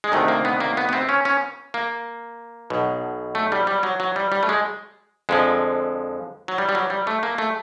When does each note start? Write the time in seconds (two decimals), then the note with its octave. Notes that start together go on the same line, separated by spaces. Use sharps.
0.04 G#3
0.12 D2 C3 D#3 A3
0.28 A#3
0.45 B3
0.60 A#3
0.77 B3
0.89 B3
0.93 C4
1.09 C#4
1.25 C#4
1.74 A#3
2.70 B1 B2
3.35 A3
3.52 G3
3.67 G3
3.83 F#3
4.00 F#3
4.16 G3
4.32 G3
4.43 A3
4.49 G#3
5.29 F2 D3 F3 G#3
6.48 F#3
6.58 G3
6.69 G3
6.75 F#3
6.90 G3
7.07 A3
7.23 A#3
7.38 A3